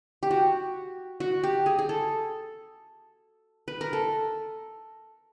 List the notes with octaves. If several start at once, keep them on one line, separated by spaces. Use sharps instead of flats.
G4
F#4
F#4
G4
G#4
G#4
A4
B4
A#4
A4